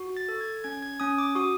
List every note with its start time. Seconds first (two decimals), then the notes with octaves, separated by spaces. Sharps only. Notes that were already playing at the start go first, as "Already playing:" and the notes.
Already playing: F#4
0.17 A6
0.29 A4
0.41 G#6
0.64 C#4 G#6
0.82 G#6
1.00 C#4 D#6
1.18 D6
1.35 F#4 D#6